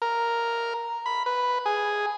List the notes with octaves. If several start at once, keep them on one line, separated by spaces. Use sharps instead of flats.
A#4
B5
B4
G#4